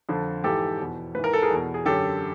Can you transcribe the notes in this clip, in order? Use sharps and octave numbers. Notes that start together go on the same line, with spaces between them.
F2 D3
G#2 E3 G4 A4
E2 B2
G#2 E3 A#4 B4
A4
G#4 A#4
E2 B2
G#4
F#2 D3 G4 A4